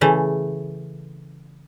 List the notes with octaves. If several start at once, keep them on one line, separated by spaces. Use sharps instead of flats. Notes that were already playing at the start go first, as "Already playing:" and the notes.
C#3 E3 A3